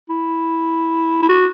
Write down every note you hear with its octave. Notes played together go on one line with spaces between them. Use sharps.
E4
E4
F#4